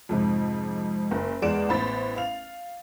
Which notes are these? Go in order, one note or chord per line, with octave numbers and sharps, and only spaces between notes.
F2 G#2 C3
F#1
E2 G#3 D5 D7 E7
A1 B3 C5 B5 A6
F5 F7